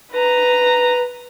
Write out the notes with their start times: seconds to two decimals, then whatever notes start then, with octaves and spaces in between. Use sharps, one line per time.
0.12 B4 A#5